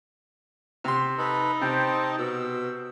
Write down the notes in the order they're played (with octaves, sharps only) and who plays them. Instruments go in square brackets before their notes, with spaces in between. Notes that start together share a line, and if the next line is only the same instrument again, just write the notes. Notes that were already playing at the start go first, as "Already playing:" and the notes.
[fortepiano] C3 C6
[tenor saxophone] D#4 [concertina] A4 B4 B5
[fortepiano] C3 C4 [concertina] C5 G5 A5
[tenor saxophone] B2 [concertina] E6